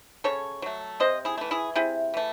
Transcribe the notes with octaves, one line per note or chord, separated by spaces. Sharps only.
C#3 A4 C#5
F#3 A3
C3 C5 D#5
E4 G#4
E3 A3
E4 G#4
C3 E4 G#4
E3 A3